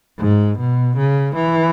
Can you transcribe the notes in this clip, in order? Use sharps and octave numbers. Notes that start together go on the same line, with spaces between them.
G#2
B2
C#3
E3